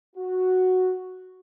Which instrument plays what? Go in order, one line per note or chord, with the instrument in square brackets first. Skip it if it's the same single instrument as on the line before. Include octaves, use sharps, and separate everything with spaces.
[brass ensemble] F#4